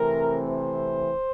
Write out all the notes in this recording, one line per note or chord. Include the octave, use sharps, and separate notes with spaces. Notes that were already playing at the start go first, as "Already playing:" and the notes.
Already playing: C3 E3 A3 C4 A#4
C5